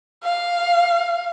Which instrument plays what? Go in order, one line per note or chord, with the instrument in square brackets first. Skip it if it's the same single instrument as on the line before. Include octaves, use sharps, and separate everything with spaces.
[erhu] F5